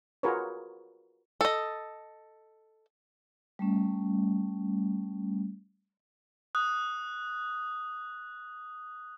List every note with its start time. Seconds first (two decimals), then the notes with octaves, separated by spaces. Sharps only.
0.23 F4 F#4 G#4 A#4 B4 C#5
1.41 A4 D#5
3.59 G3 A3 C#4
6.55 D#6 F#6